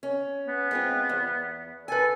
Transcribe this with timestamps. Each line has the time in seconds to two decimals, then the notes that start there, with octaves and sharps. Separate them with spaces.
0.03 C#4
0.47 B3
0.71 G#3 C4 F4
1.09 E2
1.88 A4 B4 G#5